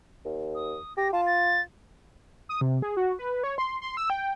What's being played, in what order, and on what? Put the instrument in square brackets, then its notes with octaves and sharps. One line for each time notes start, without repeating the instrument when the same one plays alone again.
[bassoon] D#2
[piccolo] D#6
[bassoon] G4 [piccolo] A#6
[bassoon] F4 [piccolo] A5
[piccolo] A6
[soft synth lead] D#6
C3
G#4
F#4
B4
C#5
C6
C6
E6
G5